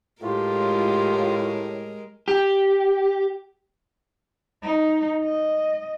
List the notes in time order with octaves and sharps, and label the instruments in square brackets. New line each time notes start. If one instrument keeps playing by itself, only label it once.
[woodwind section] A2 [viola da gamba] G#3 A#4 [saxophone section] F4 [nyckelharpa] G4
[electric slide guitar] G4
[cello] D#4
D#5